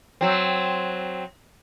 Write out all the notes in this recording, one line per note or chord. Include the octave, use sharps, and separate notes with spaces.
F#3 C4